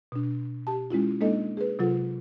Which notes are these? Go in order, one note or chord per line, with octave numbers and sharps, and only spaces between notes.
B2 D4
G4 A5
G#3 C#4 E4 F4
G#3 A#3 D4 D#4 A4 D#5
G#4 B4
C3 F#3 F4 A4